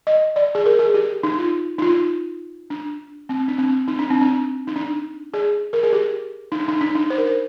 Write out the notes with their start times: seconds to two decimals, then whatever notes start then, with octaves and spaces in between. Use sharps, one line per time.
0.07 D#5
0.36 D5
0.55 G#4
0.66 A#4
0.79 G#4
0.94 G4
1.23 D#4
1.38 F4
1.78 D#4
1.82 F4
2.70 D4
3.29 C4
3.48 D4
3.58 C4
3.88 D#4
3.99 D4
4.10 C4
4.21 D4
4.67 D#4
4.76 D4
5.34 G#4
5.73 A#4
5.83 G#4
5.93 G4
6.52 D#4
6.59 D4
6.68 D#4
6.81 D4
6.95 D#4
7.10 C5
7.18 A#4
7.26 C5